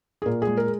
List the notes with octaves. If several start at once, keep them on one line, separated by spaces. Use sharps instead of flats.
G#4
A#2 A#4
G#4
G#3
A#4